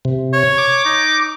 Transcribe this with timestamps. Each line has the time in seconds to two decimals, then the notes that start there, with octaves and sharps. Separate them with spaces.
0.05 C3
0.33 C#5
0.58 D6
0.85 D#4